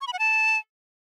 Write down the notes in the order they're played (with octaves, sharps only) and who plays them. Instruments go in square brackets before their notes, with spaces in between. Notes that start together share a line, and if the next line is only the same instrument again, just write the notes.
[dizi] C#6
B5
F#5
A5